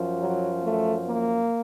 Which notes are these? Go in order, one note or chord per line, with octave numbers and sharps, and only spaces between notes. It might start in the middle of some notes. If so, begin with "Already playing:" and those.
Already playing: F#2 F3
F#3
A3
A#3